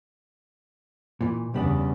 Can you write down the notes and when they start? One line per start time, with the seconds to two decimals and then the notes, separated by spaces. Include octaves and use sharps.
1.21 A#2 E3
1.54 E2 C#3 G3 B3 D4